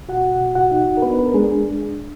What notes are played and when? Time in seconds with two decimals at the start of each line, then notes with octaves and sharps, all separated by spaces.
0.08 B2 F#4 F#5
0.41 B2
0.55 F#4 F#5
0.71 D#4
0.97 A#4
1.02 B3 D4 B4
1.19 B4
1.26 A#4
1.34 G#3 D4 G#4